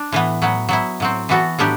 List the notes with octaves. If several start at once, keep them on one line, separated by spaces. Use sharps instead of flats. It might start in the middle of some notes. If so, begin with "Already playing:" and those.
Already playing: D4
A2 E3 B3
A2 F#3 B3
F#3 B3 E4
A2 F#3 C4
E3 B3 F#4 A4
A2 F#3 B3 D4 G4